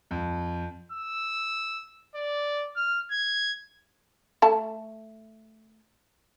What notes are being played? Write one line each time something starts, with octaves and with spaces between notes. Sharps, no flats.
F2
E6
D5
F6
G#6
A3 A5